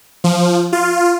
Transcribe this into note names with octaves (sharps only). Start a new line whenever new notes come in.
F3
F4